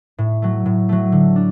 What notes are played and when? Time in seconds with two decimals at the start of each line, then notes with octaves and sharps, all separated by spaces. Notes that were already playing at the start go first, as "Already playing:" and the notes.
0.18 A2
0.42 F#3 A3
0.66 A2
0.89 F#3 A3
1.12 D3
1.36 D4